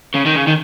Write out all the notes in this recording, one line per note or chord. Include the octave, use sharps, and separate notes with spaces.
C#3
D#3
C#3
D#3